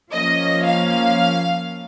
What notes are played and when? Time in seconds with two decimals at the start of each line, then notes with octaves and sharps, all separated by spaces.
0.12 F3 A#3 C#4 D#5
0.65 F5